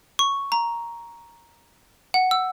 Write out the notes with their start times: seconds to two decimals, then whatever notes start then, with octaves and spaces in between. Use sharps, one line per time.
0.19 C#6
0.52 A#5
2.14 F#5
2.31 E6